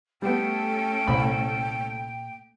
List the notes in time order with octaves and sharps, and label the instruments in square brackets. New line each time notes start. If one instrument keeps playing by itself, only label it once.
[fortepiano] G3 B3 [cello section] A3 C#4 A4 [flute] G5
[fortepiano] C2 B5 [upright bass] A#2 A#3